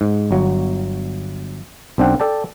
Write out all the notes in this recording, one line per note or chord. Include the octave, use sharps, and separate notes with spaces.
G#2
G1 F#3
B1 C4 D4 F#5 G5
A4 D5 G5 A5